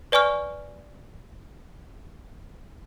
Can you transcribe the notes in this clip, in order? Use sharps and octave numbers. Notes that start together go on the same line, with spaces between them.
B4 D5 G#5 C#6 F6